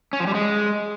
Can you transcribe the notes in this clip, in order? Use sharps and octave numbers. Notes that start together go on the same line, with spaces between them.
C#4
F3
G3
G#3